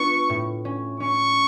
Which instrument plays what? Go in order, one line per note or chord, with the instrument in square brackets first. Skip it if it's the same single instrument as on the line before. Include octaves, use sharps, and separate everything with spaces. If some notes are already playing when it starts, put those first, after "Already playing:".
Already playing: [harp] B3 D4 F4 [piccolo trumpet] C#6
[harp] A2
C#4
[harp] C#4 [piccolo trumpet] C#6